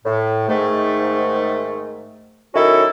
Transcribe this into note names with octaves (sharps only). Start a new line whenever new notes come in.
A2
G#2 D#3 A3
F#2 D#3 C#4 E4 F#4 A4